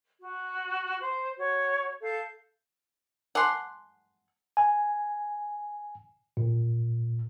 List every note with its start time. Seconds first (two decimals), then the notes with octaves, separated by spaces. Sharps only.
0.20 F#4
1.01 C5
1.37 F#4 C#5
2.02 A4 F5 G6
3.35 F#5 G#5 A5 C6 D6
4.57 G#5
6.37 A#2